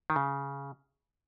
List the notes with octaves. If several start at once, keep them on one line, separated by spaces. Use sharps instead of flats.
D#3
C#3